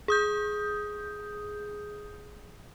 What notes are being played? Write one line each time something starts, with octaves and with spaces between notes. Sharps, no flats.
G#4 D#6 G6